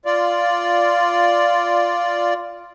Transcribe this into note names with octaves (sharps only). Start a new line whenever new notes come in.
F4 D5